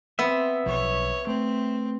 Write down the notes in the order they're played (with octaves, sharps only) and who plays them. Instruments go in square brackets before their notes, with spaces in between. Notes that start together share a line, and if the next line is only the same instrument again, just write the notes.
[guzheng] B3 [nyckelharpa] C4 [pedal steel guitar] E5
[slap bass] B1 F3 [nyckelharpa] C#5
[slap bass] A3 [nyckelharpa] C4